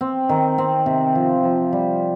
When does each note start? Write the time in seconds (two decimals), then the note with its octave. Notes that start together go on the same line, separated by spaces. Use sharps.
0.01 C4
0.29 D#3
0.58 C4
0.86 C3
1.15 F3
1.44 F3
1.73 G3